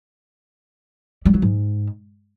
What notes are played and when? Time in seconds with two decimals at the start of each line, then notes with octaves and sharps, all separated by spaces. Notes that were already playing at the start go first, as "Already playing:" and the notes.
1.25 G3
1.34 F#3
1.42 G#2